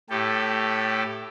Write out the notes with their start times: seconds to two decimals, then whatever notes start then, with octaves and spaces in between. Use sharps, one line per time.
0.10 A2 G4 A4